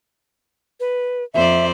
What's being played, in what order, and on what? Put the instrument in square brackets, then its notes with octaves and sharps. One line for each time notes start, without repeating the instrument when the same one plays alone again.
[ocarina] B4
[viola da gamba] F2 C5 D5 [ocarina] E5